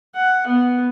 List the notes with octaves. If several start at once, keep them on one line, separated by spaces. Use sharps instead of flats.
F#5
B3